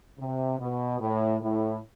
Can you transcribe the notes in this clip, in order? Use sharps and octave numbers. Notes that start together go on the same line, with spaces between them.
C3
B2
A2
A2